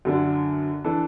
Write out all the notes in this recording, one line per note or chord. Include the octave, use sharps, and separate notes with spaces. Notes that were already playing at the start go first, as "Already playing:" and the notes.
F#2 D3 F#3 D4
E3 D4 A4